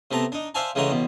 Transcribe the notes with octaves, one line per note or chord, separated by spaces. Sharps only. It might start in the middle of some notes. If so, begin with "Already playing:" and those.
C3 A3 B3 A5 A#5
D4 D#4
C5 D5 E5 F5 G#5 A5
C#3 E3 G#3 A3 F#4 A#5
A1 B2